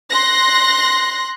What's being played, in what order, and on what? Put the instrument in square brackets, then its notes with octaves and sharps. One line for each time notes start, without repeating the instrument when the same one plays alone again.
[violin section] C6 F#6 A#6